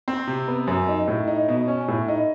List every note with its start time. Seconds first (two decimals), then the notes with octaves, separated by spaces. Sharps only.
0.08 C4
0.27 C3
0.48 B3
0.67 F#2
0.88 D#4
1.08 A2
1.28 D#4
1.49 B2
1.68 C#4
1.88 A2
2.08 D#4